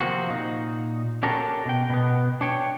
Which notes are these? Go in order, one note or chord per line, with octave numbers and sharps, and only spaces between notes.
C3 F3 A#3 C4 F#4
A#2 D#4
C#4 D4 F#4 G4 A4 A#4
B2 G5
B2 B3
D4 C#5 G5